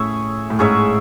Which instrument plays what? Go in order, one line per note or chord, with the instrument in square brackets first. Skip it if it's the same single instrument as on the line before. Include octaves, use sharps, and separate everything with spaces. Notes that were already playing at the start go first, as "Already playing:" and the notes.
Already playing: [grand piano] A2 [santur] C#4 G#4 C#5 E5
[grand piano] A2
[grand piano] G#2 [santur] C#4 G#4 C#5 E5